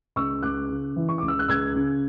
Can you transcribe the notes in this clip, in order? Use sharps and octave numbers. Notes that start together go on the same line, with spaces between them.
C#2 C#6 E6
C#2 D6 F#6
C#3
E3
C#6
C#2 D6
E6
F#6
C#2 E6 G#6
C#3